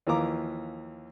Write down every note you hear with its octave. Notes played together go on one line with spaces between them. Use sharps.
D#2 E3 F3 A#3 A#5 D6